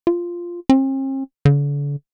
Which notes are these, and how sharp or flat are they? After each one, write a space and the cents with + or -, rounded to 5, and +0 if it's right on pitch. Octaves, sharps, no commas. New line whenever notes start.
F4 -5
C4 +45
D3 -40